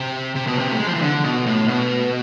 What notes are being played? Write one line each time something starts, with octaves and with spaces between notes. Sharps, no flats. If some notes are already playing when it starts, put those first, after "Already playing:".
Already playing: C3
C3
B2
C3
A3
G#3
F3
E3
D3
B2
A2
B2